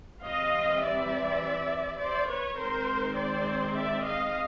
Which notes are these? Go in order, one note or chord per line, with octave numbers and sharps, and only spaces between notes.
E3 G3 C4 D#5 F5
D5 E5
C5 D5
B4 C#5
D#3 G#3 C4 A#4 C5
C5 D5
D5 E5
D#5 F5